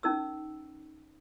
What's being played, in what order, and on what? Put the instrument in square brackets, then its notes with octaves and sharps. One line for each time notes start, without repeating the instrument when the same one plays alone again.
[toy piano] C#4 D#4 A#4 E6